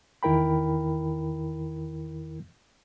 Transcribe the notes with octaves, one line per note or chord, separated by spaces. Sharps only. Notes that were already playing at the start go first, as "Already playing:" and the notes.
E2 D#3 E4 A#4 G5 B5